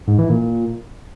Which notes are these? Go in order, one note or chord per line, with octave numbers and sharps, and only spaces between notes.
G#2
E3
A#2